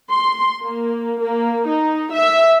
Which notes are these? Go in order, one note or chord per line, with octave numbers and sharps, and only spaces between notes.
C6
A#3
A#3
D#4
E5